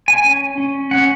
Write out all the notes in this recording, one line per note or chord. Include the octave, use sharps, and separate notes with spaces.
G#5
C#4
C#4
C#4 F#5